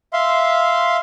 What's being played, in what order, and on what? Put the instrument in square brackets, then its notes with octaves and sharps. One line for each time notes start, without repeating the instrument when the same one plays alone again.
[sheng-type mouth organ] E5 F5 C6